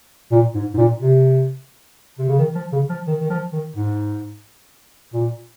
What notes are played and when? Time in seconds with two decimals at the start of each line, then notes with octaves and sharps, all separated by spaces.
0.31 A#2
0.55 G#2
0.74 G#2
0.77 A#2
1.01 C3
2.19 C3
2.28 C#3
2.39 D#3
2.55 F3
2.72 C#3
2.89 F3
3.07 D#3
3.20 D#3
3.30 F3
3.53 D#3
3.76 G#2
5.13 A#2